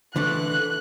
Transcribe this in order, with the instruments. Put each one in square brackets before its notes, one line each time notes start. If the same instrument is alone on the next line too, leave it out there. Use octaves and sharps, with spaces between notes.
[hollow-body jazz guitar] D3 E3 A3 [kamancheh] F#6